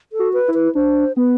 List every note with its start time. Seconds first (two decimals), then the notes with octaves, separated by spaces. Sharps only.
0.13 A4
0.19 F#4
0.33 B4
0.48 E4
0.54 B4
0.75 D4 C5
1.17 B3 B4